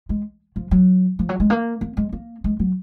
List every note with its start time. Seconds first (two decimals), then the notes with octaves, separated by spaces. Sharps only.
0.09 G#3
0.56 F3
0.71 F#3
1.19 F3
1.29 F#3
1.40 G#3
1.50 A#3
1.81 A#3
1.97 G#3
2.12 A#3
2.44 G#3
2.59 F#3